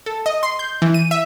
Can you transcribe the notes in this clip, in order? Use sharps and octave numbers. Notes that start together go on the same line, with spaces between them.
A4
D#5
C6
G6
E3
D#7
E5